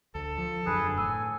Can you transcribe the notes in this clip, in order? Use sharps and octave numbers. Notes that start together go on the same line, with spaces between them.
D2 A4
F3
E1 F#2 D3 G#4 B4
A2 G#5 E6